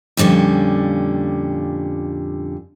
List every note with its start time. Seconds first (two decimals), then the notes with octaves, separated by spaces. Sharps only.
0.17 F2 A#2 D3 G3 C#4